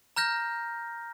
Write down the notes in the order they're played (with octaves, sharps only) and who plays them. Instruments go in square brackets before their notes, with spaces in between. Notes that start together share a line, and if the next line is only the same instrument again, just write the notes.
[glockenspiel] A#5 F6 G6 A#6